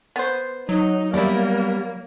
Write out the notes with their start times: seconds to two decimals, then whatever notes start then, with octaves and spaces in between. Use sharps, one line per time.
0.16 B3 C5
0.69 F#3 D#4
1.14 G3 A#3 B3 E4 D5